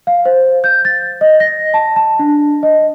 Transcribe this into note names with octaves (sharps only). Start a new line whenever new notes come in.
F5
C5
G6
A6
D#5
A#6
A5
A5
D4
D#5